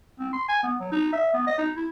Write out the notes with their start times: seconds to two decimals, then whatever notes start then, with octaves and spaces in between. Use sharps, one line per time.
0.19 C4
0.33 C6
0.48 G#5
0.63 B3
0.80 F#3
0.92 D#4
1.12 E5
1.33 B3
1.47 D#5
1.58 D#4
1.76 E4